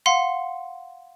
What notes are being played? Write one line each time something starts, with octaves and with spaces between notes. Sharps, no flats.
F5 F#5 C6